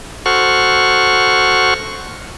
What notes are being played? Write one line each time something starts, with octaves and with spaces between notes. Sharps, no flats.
F#4 A4 C5 F#5 C#6 F6